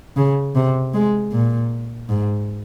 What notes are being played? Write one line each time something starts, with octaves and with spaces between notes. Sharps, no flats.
C#3
C3
G#3
A#2
G#2